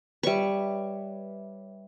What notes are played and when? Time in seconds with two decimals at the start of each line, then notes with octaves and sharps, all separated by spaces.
0.23 G3 B4 C#5 E5 C#6